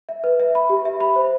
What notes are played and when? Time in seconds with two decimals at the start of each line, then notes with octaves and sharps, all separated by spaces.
0.09 E5
0.24 B4
0.40 E5
0.55 B5
0.70 G4
0.85 E5
1.00 B5
1.16 C5